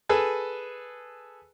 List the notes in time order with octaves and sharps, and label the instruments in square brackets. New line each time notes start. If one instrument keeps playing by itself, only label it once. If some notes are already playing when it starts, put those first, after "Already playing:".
[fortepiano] G#4 A4 B4 G#5